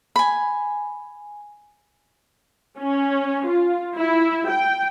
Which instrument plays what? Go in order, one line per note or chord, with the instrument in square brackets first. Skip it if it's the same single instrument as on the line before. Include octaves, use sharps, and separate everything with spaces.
[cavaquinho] G#5 B5
[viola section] C#4
F4
E4
G5